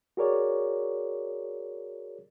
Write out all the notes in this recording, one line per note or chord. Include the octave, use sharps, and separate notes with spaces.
F#4 G#4 A#4 C#5 D5